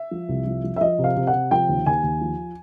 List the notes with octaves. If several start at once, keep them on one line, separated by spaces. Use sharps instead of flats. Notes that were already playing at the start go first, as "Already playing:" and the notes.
Already playing: E5
F3
C2
F3
F3
E5
F3 D#5
C3
F5
C3
F#5
C3
F3 G5
D#2
D#2 G#5
D#2
F3